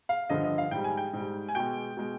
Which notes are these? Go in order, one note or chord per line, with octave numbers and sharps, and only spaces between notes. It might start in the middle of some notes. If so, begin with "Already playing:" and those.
F5
G2 D3 F3 D#5
D#5
F5
G#2 G3 G5
G#5
G5
G#2 G3
G#5
B2 G#3 G5
B2 G#3